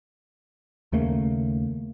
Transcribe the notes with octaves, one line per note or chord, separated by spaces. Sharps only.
D#2 C#3 A3 A#3